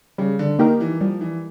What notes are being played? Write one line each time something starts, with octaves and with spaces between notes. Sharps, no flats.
C#3 G3
D3
D#3 A#3 D#4 G4 A#4
E3
F3 G3
E3